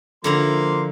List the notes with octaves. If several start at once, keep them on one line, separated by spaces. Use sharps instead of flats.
D3 F3 A#3 E4 A#5 C6